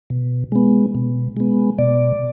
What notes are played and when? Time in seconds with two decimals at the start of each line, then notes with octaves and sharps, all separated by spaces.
0.10 B2
0.52 G#3 B3
0.95 B2
1.37 G#3 B3
1.78 B2 D5